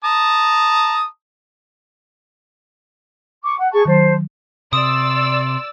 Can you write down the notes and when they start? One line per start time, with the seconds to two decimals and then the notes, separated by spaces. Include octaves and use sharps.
0.04 A5 A#5 D#6
3.43 C#6 D6
3.57 F#5
3.72 G#4 A5 C#6
3.85 D#3 F#3 C5 A5
4.73 C3 D5 C6 D#6 E6